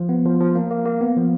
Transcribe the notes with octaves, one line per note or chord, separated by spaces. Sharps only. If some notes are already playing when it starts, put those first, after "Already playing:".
Already playing: F3
B3
F3
F3
A#3
A#3
A#3
B3
F3